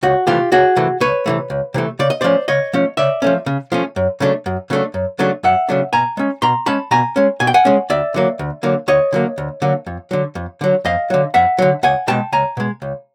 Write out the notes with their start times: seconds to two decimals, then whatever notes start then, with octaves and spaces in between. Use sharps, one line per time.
0.03 C#2 F#4
0.27 C3 E3 A3 F4 G4
0.52 C#2 F#4 G#4
0.76 C3 E3 A3
1.00 C#2 B4 C#5
1.26 C3 E3 A3
1.50 C#2
1.74 C3 E3 A3
1.99 C#3 D5
2.10 D#5
2.21 F3 A3 C#4 C5 D5
2.48 C#3 C#5 D#5
2.73 F3 A3 C#4
2.97 C#3 D5 E5
3.22 F3 A3 C#4
3.46 C#3
3.72 F3 A3 C#4
3.96 F#2
4.20 C#3 F#3 A3 D4
4.46 F#2
4.70 C#3 F#3 A3 D4
4.94 F#2
5.19 C#3 F#3 A3 D4
5.43 F#2 E5 F#5
5.69 C#3 F#3 A3 D4
5.93 B2 G#5 A#5
6.17 G#3 C#4
6.42 B2 A#5 C6
6.66 G#3 C#4 A5 B5
6.91 B2 G#5 A#5
7.16 G#3 C#4
7.40 B2 G#5
7.47 G5
7.54 F#5 G#5
7.65 G#3 C#4
7.90 D2 D5 E5
8.14 D3 F#3 A#3
8.39 D2
8.63 D3 F#3 A#3
8.88 D2 C#5 D#5
9.13 D3 F#3 A#3
9.38 D2
9.62 D3 F#3 A#3
9.86 F2
10.11 D3 F#3
10.35 F2
10.61 D3 F#3
10.85 F2 D#5 F5
11.10 D3 F#3
11.34 F2 E5 F#5
11.58 D3 F#3
11.83 C#2 F#5 G#5
12.08 B2 G#3 G5 A5
12.32 C#2 G#5 A#5
12.57 B2 G#3
12.82 C#2